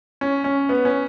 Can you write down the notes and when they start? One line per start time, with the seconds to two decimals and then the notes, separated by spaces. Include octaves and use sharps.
0.21 C#4
0.44 C#4
0.69 B3
0.85 C#4